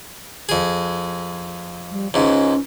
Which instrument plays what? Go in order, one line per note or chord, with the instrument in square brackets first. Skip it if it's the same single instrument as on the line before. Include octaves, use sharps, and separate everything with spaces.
[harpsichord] F2 G#4
[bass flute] G3
[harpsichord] C#2 G#2 [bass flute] C#4